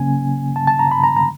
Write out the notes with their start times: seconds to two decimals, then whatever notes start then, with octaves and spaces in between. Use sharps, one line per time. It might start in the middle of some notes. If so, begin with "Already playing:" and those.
Already playing: C#3 F#3 A#3 C#4 G#5
0.56 A5
0.67 A5
0.79 A#5
0.91 B5
1.04 A#5
1.16 A#5